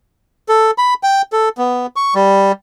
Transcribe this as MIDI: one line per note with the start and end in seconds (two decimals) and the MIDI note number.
0.49 0.71 69
0.78 0.94 83
1.03 1.22 79
1.32 1.49 69
1.58 1.86 59
1.96 2.14 85
2.15 2.52 55